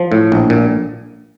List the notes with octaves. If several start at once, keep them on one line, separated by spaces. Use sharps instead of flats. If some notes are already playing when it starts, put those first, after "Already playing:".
Already playing: F3
A2
A#1
A#2